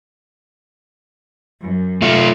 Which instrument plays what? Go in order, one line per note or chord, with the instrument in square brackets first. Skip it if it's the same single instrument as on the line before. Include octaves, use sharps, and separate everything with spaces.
[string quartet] F#2
[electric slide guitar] A3 F4